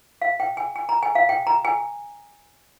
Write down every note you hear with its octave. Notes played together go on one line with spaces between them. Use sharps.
F5
G5
G#5
G#5
A#5
G#5
F5
G5
A#5
G#5